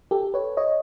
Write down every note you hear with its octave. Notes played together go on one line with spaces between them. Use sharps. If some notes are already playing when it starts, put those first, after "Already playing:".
G4 A4
B4 C#5
C#5 D#5